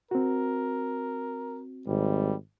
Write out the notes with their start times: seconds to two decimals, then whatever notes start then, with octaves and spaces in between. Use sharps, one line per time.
0.11 C4 F#4 A#4
1.87 G#1 G3